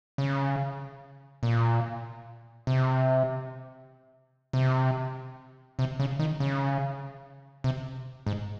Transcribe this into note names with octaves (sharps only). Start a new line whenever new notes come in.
C#3
A#2
C3
C3
C3
C#3
D#3
C#3
C3
G#2